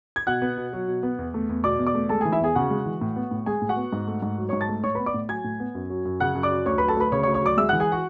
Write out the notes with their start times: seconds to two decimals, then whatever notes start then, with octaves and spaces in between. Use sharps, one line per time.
0.16 G#6
0.27 B2 F#5 F#6
0.42 B3
0.57 B2
0.73 F#3
0.88 B2
1.03 B3
1.19 E2
1.34 A3
1.49 E2
1.64 B2 D5 D6
1.79 E2
1.87 D5 D6
1.94 A3
2.09 G#3 A4 A5
2.21 E3 G#4 G#5
2.32 E4 E5
2.40 E2 G#4 G#5
2.55 C#3 F#4 F#5
2.71 G#3
2.86 E3
3.01 A2
3.16 B3
3.31 A2
3.46 G#3 G#4 G#5
3.62 A2
3.69 F#4 F#5
3.76 B3
3.93 G#2
4.07 A3
4.22 G#2
4.38 F#3
4.49 G#2 C#5 C#6
4.61 A5 A6
4.68 A3
4.84 A2 C#5 C#6
4.95 B3 B4 B5
5.06 D5 D6
5.14 A2
5.29 F#3 G#5 G#6
5.44 A2
5.60 B3
5.75 F#2
5.90 F#3
6.05 F#2
6.20 C#3 F#5 F#6
6.35 F#2
6.43 D5 D6
6.51 F#3
6.66 D2 C#5 C#6
6.78 F#3 B4 B5
6.88 A4 A5
6.97 D2 B4 B5
7.12 C#3 C#5 C#6
7.23 C#5 C#6
7.27 D2
7.34 C#5 C#6
7.42 F#3 D5 D6
7.57 G#3 E5 E6
7.69 E3 F#5 F#6
7.80 G#4 G#5
7.92 F#4 F#5